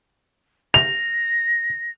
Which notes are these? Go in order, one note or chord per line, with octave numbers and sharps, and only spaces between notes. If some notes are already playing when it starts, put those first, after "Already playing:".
A#6 F7